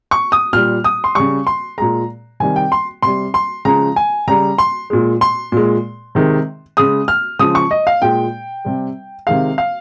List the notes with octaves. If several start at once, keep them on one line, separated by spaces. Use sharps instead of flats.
C#6
D#6
A#2 G3 F6
D#6
C6
C#3 G3 C#6
C6
A#2 G#3 A#5
C3 D#3 G3 G#5
G5
C6
C3 G3 C6
C6
C#3 F3 G#3 A#5
G#5
C#3 G3 A#5
C6
A#2 G#3
C6
A#2 G#3
C3 D#3 G#3
C#3 G#3 D#6
F6
C#3 F3 G#3 D#6
C#6
D#5
F5
A#2 G#3 G5
C3 G3
C3 D#3 G#3 F5
F5